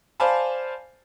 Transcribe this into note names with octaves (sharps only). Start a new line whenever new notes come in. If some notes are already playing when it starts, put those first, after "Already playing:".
C5 D5 F5 G#5 A5 B5